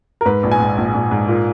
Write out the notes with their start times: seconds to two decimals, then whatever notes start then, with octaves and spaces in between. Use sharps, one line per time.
0.21 A#4
0.25 G#2 B4
0.43 A#1
0.51 G#5
0.60 G#2
0.77 A#1
0.94 A#1
1.11 G#2
1.28 A#2